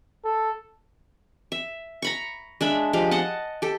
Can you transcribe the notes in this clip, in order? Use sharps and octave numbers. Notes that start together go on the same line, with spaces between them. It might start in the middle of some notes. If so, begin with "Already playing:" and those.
A4
E5
A#5 B5 C#6
G#3 D4 E5 B5
F3 G#3 G4 F5
D#5 F#5 A5
G4 A4